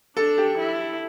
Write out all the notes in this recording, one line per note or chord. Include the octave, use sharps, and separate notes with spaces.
D4 A4
G4
E4